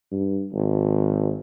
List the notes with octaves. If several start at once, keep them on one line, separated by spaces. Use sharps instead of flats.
G2
G#1